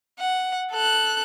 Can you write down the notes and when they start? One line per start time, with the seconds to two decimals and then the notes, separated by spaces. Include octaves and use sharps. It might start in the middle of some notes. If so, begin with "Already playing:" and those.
0.20 F#5
0.72 A4 F#6